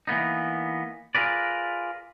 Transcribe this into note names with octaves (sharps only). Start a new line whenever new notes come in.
E3 A#3 B3 D#4
F4 G#4 A#4 B4 D5